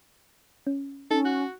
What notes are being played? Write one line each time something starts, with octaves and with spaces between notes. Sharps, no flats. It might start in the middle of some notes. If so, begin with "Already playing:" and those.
C#4
C#4 D#4 A4
F#4 F#6